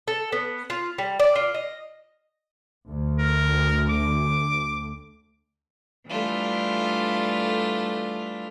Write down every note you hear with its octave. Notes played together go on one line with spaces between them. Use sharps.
A4
B3
F4
G3
D5
F4
D#5
D2
A#4
D6
E3 G3 A3 D4 F4